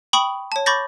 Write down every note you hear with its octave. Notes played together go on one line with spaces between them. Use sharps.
G5 B5 C#6 D#6 F#7
C#5 A5
B5 C#6 D6 G6 A6 A#6